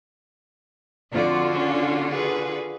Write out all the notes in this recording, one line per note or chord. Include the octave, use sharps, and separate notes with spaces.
F2 D3 F4 F#4 D5
C#4 D4
G#4 B4